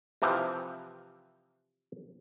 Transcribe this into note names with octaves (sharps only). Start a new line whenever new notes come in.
C3 E3 F3 G4